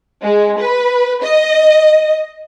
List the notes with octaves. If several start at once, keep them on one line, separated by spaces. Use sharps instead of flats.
G#3
B4
D#5